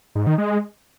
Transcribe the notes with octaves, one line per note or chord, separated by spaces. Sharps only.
G#2
D#3
G#3